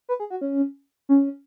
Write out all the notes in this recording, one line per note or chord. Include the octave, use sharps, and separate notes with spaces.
B4
G#4
F#4
C#4
C#4